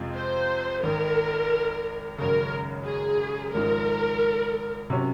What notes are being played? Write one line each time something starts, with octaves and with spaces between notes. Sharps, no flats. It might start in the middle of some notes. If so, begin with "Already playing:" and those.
Already playing: F2 C3 F3 G#3 C4
C5
G#1 G#2 D#3 A#4
G#1 F#2 C#3 A#4
G#4
G#1 G#2 F3 A#4
C3 F#3 C#4